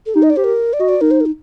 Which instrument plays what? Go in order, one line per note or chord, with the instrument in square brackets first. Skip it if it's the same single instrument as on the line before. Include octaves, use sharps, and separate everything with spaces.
[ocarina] A4
[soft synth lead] D#4 [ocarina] G4
[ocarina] D#5
D5
[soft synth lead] G4 [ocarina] C5
[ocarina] A#4
D5
[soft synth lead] F#4 [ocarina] D#5
[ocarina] D5
[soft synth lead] D#4 [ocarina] A#4
[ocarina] C5
A#4
D#4